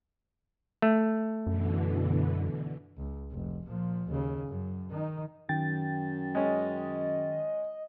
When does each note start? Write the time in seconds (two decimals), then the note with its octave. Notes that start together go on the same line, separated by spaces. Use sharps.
0.82 A3
1.47 F#2 B2 D3 E3
2.97 C#2
3.32 F1
3.67 A#2 F3
4.08 D#2 C#3
4.48 F#2
4.90 D#3 D#4
5.49 F#2 D#3 G5 A6
6.35 G#3 C#4 D#5